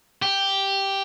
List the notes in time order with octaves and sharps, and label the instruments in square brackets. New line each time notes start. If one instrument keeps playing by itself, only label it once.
[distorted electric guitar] G4